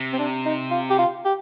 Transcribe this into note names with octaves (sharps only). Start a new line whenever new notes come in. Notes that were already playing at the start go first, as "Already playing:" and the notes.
Already playing: C3
C4
D4
D#4
F4
G4
F4
G4